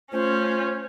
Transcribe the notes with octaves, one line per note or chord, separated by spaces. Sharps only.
A3 C#4 F4 C5